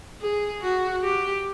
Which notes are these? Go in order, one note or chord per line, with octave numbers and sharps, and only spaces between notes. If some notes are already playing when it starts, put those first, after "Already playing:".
G#4
F#4
G4